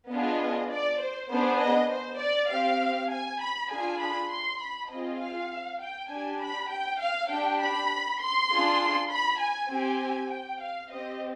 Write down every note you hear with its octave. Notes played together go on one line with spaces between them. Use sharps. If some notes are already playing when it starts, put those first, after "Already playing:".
B3 D4 F4 G#4 D#5
D5
C5
B3 D4 G#4 C5
D#5
C5
D5
C4 G4 F5
G#5
B5
D4 F4 G#4 G#5
B5
C6
B5
C4 F4 G#4 D#5
F5
G5
D4 G4 G#5
B5
G5
F5
D4 G4 G5
B5
C6
D4 F4 G#4
B5
G#5
C4 G4 G#5
G5
F5
C4 G4 D#5